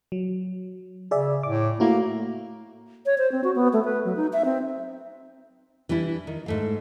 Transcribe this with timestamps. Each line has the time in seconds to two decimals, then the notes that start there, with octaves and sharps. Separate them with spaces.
0.12 F#3
1.11 C#3 G#4 D5 E5
1.43 A2 D6
1.80 A3 A#3 E4 F#4
3.06 C#5
3.18 C5
3.32 C4
3.44 F#4
3.56 B3
3.73 A3
3.85 B4
4.05 F#3
4.16 D#4
4.33 E5
4.45 C4
5.89 E3 G3 D4 E4
6.27 D#3
6.46 G#2 A3 F5